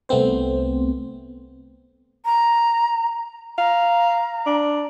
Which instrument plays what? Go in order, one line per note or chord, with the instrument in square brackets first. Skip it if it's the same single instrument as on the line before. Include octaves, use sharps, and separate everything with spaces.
[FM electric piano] C2 A3 B3 C4 C5
[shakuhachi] A#5
[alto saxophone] F5 [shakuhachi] A#5
[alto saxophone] D4